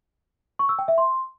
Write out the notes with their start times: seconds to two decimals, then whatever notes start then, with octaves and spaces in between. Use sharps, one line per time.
0.59 C#6
0.69 E6
0.79 G5
0.88 E5
0.98 C6